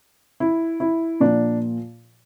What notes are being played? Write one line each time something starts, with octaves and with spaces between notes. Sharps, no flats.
E4
E4
A#2 F3 A#3 D4